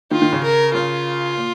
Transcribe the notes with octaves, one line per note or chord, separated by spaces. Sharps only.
D#3 F4
D#3
C#3
A#4
C#3 F4
A#2